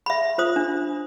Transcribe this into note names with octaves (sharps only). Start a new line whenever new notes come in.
E5 B5
F4 C5 D#6
D4